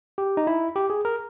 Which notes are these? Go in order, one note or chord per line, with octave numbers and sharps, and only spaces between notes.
G4
D#4
E4
G4
G#4
A#4